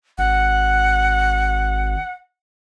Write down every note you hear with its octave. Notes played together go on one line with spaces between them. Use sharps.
G#1 F#5